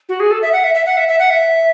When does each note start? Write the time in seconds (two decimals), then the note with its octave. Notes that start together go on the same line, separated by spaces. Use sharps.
0.09 F#4
0.20 G#4
0.31 A4
0.42 E5
0.53 F#5
0.64 E5
0.75 E5
0.86 F#5
0.97 E5
1.09 E5
1.19 F#5
1.30 E5